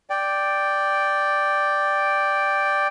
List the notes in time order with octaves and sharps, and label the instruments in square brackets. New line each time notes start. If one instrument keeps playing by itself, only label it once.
[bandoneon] D5 G5